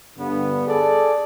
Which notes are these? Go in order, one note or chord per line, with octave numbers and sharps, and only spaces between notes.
G2 D3 B3
G#4 A4 D5